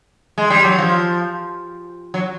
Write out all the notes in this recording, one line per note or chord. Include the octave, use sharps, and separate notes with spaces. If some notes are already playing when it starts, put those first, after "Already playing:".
G#3
G3
F#3
F3
F#3